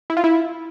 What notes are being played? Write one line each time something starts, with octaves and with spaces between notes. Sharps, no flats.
E4
F4
E4